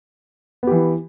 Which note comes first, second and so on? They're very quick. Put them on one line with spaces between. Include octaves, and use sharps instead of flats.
B3 G4 E3